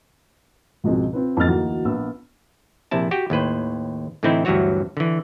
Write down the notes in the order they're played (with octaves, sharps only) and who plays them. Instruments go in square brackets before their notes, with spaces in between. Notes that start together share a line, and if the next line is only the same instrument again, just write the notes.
[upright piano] C#2 G#2 B2 F3 G#3 C4
C4 F4 B4
F2 B3 D#5 F6 A6
D2 E3 A#3 D#4 F#4 A6
A#1 B3 E6
[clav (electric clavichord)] A#1 C3 E4 A5
F#4 G4 G5
D#2 A2 B4 C5
A2 D3 E3 C4 D#4 E4
D2 G2 E3 F#3 F#4 C#5
D3 E3